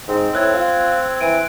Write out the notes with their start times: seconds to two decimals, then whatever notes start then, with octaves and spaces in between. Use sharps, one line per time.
0.08 G#2 C4
0.33 A2 E6 F#6 G#6
0.54 F4
1.21 E3 D7 D#7